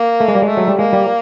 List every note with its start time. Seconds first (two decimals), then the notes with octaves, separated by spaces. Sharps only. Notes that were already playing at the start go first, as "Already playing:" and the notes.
Already playing: A#3
0.20 A3
0.28 G#3
0.35 G3
0.42 G#3
0.49 A3
0.57 F#3
0.67 G3
0.79 G#3 A#3
0.93 G3